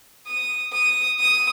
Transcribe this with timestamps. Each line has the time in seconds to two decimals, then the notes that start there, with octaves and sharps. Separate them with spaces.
0.27 D#6
0.73 D#6
1.19 D#6